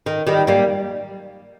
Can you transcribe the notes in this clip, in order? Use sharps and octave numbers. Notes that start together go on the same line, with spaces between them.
D#3
D#3 G3
G3 A#3